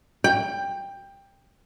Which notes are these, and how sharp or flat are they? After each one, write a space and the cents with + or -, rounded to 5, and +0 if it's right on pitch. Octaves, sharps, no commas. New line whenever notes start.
G5 +15